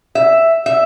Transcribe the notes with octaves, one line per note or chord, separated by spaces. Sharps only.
E5
E5